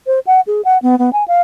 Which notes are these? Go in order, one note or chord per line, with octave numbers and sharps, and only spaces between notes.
C5
F#5
G#4
F#5
B3
B3
G#5
F5